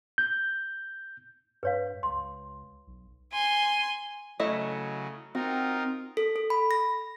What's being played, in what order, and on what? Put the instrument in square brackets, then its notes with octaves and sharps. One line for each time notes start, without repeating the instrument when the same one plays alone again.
[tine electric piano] G6
[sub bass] G2 [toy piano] B4 C#5 F5
[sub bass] C#2 [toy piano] C6
[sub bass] B1
[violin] G#5 C6
[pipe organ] C#3 F#3 [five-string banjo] A3 E4 D#5
[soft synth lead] C4 [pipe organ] D#4 F4 A#4 [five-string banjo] F#4
[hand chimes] A4
A4
B5
A#6